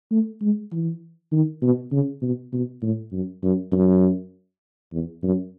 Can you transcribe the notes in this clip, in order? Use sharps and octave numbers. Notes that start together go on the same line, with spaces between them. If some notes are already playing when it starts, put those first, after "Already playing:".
A3
G#3
E3
D#3
B2
C#3
B2
B2
A2
F#2
F#2
F#2
E2
F#2